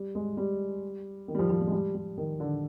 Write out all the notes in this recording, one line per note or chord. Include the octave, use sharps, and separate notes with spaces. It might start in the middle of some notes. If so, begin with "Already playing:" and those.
Already playing: G3
G#3
G3
D#3
G3
F3
F3
G3
G#3
G3
G3
D#3
D3